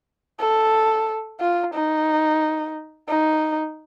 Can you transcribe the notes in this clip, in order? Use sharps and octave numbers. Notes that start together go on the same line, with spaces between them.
A4
F4
D#4
D#4